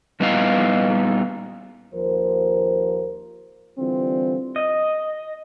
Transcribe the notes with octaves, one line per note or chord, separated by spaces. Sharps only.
A#2 G3 B3 D#4 E4 F5
D#2 F3 A#4 C5
D3 E3 G3 C4 F4
D#5